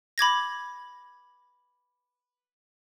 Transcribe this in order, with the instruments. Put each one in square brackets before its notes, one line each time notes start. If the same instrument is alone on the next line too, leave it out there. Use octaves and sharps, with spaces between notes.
[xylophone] B5 D6 G#6 A#6